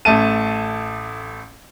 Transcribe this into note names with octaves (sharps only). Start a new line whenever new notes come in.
A1 A3 A5 D#7